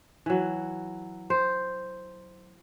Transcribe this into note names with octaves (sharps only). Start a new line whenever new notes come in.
E3 F#3
C5